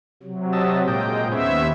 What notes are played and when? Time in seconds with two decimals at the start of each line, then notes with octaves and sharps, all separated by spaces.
0.23 C3 F#3
0.53 D#5 E5 A5
0.88 A#2 G#3 D#5 G5
1.32 D#2 B3 C#4 C5 E5